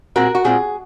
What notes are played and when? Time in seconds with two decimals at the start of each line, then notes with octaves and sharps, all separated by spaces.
0.16 A#2 G#3 C4 F#4 A#4
0.35 F#4
0.44 A#2 G#3 C4 F4 G#4